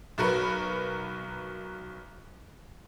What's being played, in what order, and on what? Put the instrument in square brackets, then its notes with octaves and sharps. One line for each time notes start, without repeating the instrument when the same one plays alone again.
[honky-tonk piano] B1 F#4 A#4 B4